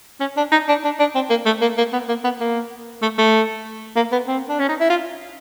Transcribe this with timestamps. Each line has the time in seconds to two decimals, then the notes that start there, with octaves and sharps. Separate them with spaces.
0.20 C#4
0.37 D4
0.52 D#4
0.69 D4
0.84 D4
0.99 D4
1.15 C4
1.30 A#3
1.46 A3
1.61 A#3
1.78 A#3
1.93 B3
2.08 A#3
2.24 B3
2.41 A#3
3.02 A3
3.18 A3
3.96 A#3
4.12 B3
4.28 C4
4.49 D4
4.59 C#4
4.69 D#4
4.80 E4
4.90 F4